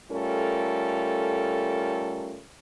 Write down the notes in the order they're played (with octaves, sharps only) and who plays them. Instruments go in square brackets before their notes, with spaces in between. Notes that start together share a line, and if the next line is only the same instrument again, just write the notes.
[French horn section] G3 A3 C#4 F4 A4 A#4